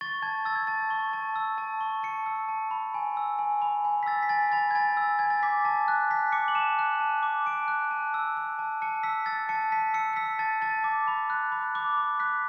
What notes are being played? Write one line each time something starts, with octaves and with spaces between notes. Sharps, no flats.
C#6 A6
A5 G#6
E6 A6
G#6
A5 A6
C#6
A5
E6
A5
C#6
A5 C#7
E6
A5
B5
G#5
E6
G#5
B5
G#5
B6
E6 A6
B6
G#5 A6
B5 A6
G#6
G#5 A6
E6
G#5 G#6
A6
D6 B6
A5
F#6
A5 B6
D6 C#7
F#7
A5 E7
F#6
A5
D6
A5 D7
F#6
A5
E6
E6
A5
A5 C#7
E6 B6
E6 A6
A5 C#7
A5 B6
E6 C#7
C#7
E6 B6
A5 A6
A5 A6
D6
B5
F#6
B5
D6
B5
F#6 B6